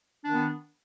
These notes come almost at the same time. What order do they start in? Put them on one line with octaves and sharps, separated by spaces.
D4 D#3 B3